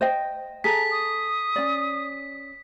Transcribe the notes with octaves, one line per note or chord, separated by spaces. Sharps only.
C5 D#5 G5
G#4 A4 A#5 B6
D#6
C#4 D5